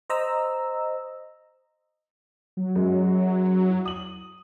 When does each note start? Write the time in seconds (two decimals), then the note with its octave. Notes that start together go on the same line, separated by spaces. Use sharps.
0.10 C5 D#5 A#5 E6
2.57 F#3
2.75 F#2 G#3
3.68 E4
3.85 D#6 F#7